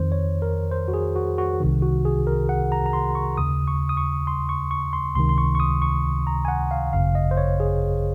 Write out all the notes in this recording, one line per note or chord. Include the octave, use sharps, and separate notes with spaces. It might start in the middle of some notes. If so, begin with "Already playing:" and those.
Already playing: F2 D#3 C5
C#5
A#4
C5
F#4
G#4
F#4
F#4
C2 C3 D#3
F#4
G#4
A#4
F#5
A#5
A#5
C6
C#6
D#2 C#3 D#6
C#6
D#6
C#6
C6
C#6
C#6
C6
C#2 C3 D#3 C6
C6
C#6
C#6
D#6
C#6
A#5
G#5
F#5
F5
G#1 F#2 C#3 F5
D#5
C5
C#5
G#4